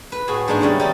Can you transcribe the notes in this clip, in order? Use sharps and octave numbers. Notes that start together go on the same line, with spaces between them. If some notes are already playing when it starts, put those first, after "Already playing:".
B4
A2 F#4 G#4
G#2 A3 A#3 D4 D#4 G#5
C#3 E3 G3 B3
G3 D#4 G4